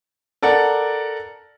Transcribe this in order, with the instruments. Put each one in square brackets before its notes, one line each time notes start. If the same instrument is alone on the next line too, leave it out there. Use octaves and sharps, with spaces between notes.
[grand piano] A4 A#4 D5 F#5